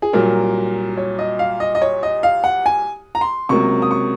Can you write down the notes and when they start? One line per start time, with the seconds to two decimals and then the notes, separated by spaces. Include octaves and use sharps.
0.02 G#4
0.13 C2 A#2 F#3 A#4
0.97 C#5
1.19 D#5
1.39 F5
1.60 D#5
1.75 D#5
1.82 C#5
2.03 D#5
2.23 F5
2.44 F#5
2.66 G#5
3.15 A#5
3.21 C6
3.49 C#2 C3 F#3 A#3 C#6
3.82 D#6
3.91 C#6